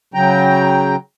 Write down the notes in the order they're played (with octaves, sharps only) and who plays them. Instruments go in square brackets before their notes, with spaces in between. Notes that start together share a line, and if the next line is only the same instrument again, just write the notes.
[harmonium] C#3 F#3 G5 A#5